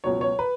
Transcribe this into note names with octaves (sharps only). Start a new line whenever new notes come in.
C#2 B2 F#3 C#5
C#5
B4